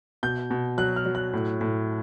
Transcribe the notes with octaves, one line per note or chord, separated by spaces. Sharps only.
B2 G6
B2
F#3 F#6
F6
F#3
F#6
A2
A2